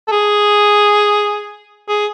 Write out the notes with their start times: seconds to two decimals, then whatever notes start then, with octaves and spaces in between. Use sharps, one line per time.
0.08 A4
0.12 G#4
1.88 G#4